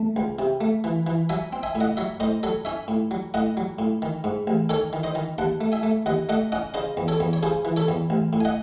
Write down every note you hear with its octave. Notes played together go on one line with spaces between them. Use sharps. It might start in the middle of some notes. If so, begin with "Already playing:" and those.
Already playing: A3 A5
C#2
C3
A3
E3
E3
F#3 E5 G#5
C4
E5 G#5
A2
D#5 F#5
F#3 C#5 E5
A2 C5 D#5
F#3 A4 C#5
C#4 C#5 E5
A2
F#3
A2 D#5 F#5
F#3
A2
D#3
G#2
A1
D#3 A4 C#5
D#3
C5 D#5
D#3
D#2 F#5 A5
A3
E5 G#5
A3
D#2 D#5 F#5
A3 D#5 F#5
C#4 D#5 F#5
C#3 C5 D#5
E2
A4 C#5
E2
C#5
C#3 G#4 C5
E3
A4 C#5
E2
A1
A2
G#5
D#5 F#5